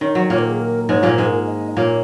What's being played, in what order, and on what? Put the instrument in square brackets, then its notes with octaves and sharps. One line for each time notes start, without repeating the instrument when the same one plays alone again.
[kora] D#3 [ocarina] C#5
[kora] F#3
[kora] A#2 A#3 [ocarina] C#5
[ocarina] A#4
G#4
A#4
[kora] G#2 G#3 [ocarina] C#5
[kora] A#2 A#3
[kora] G#2 G#3 [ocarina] A#4
[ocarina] D#5
[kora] A#2 A#3 [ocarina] C#5